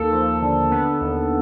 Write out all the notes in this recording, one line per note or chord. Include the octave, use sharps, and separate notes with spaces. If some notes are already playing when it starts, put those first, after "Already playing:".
Already playing: D#2 A#3 A4
F3
D3
B3
D#2